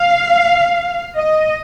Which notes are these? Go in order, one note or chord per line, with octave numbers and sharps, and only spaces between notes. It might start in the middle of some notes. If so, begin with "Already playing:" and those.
Already playing: F5
D#5